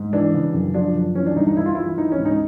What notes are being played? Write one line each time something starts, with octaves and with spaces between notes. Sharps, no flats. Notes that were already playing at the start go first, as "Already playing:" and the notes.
Already playing: G#2
E3 D4
C#3
F#2
F3 D4
F#2
E3 C#4
D4
G2 D#4
D#4
G2 E4
F4
E3 E4
E3 D#4
C#4
G#2
D#4